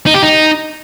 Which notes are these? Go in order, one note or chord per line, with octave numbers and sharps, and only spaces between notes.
D#4
G4
D#4